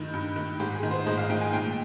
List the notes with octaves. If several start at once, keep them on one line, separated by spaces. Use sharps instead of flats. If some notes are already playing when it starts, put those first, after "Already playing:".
Already playing: G2 D#3 D#4
G2
D#3
G#2 G4
G#4
D#3
C5
G#2 D#5
F5
D#3 G5
G#5
A#2 G5
G5